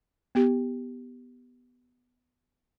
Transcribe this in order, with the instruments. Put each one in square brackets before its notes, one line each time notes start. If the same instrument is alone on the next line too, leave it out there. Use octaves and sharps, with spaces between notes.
[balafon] B3 G4